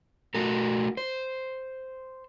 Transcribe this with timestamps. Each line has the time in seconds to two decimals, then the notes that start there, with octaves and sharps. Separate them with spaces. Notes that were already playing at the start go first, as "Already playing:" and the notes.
0.34 A3 F#4 A#4
0.97 C5